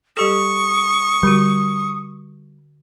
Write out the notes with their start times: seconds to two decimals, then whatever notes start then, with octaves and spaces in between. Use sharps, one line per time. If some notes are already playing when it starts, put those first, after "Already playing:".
0.17 G3 G4 A4 C#6 D#6
1.23 D3 G3 F#4